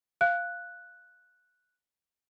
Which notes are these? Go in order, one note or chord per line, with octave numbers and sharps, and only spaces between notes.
F5 F#6